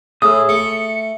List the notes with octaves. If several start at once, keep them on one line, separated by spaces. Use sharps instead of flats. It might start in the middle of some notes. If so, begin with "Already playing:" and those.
A2 G#4 D#6 E6
A3 C#7